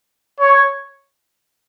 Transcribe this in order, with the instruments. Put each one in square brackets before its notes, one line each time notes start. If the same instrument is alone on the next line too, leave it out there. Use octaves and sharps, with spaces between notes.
[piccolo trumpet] C#5